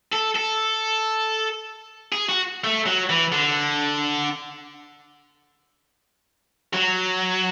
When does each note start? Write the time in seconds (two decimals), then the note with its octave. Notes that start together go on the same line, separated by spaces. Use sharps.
0.13 A4
0.36 A4
2.13 G#4
2.29 F#4
2.64 A3
2.86 F#3
3.09 E3
3.32 D3
6.74 F#3